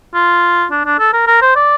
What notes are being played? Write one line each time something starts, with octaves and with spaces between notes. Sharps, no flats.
F4
D4
D4
A4
A#4
A#4
C5
D5